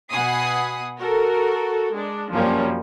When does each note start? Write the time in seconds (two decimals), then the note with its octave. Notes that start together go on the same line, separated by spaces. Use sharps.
0.10 B2 F#5 G#5 B5 D#6 C7
1.00 F#4 A4 A#4
1.93 G#3 D4
2.33 F#2 C3 F3 G3 A#3 C#4